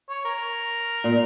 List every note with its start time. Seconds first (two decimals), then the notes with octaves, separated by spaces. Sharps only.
0.09 C#5
0.25 A#4
1.04 A#2